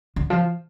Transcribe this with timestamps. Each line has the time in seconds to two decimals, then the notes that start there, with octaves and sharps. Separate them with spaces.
0.16 D3
0.30 F3